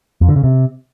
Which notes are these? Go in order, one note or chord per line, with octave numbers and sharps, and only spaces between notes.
F2
D3
C#3
C3